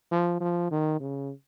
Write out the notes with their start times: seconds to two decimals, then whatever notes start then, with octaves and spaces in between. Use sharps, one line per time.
0.11 F3
0.40 F3
0.71 D#3
1.00 C#3